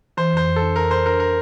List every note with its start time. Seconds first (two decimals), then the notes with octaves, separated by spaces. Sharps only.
0.17 E3 C5
0.33 F2 C5
0.46 F2
0.56 A4
0.61 D4
0.76 F2 A#4
0.91 E3 C5
1.06 D4 A#4
1.19 D4 A#4